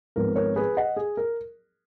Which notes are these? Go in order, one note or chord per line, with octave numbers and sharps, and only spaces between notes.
G#1 G#2 F3 B3 A#4
A#4 C#5
G#4 B4
D#5 F#5
G#4
A#4